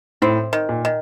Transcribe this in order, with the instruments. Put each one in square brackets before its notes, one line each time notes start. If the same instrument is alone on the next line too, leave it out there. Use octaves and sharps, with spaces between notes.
[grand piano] A2 [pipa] C4
[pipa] D#3
[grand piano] A#2
[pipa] D#3